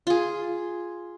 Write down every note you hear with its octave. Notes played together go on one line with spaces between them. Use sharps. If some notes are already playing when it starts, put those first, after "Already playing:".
F4 G#4